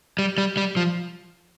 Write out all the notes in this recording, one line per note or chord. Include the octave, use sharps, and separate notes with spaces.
G3
G3
G3
F3